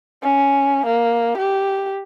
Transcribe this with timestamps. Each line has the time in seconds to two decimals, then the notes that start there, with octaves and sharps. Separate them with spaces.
0.23 C#4
0.86 A#3
1.37 G4